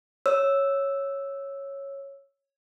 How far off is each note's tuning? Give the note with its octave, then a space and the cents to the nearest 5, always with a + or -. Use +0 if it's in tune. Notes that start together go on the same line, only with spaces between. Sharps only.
C#5 -5 E6 +0